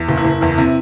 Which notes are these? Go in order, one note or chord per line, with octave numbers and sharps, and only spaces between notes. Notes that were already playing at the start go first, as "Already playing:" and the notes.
Already playing: E2
F#1
E4
F#1
E2 E4
C3 E4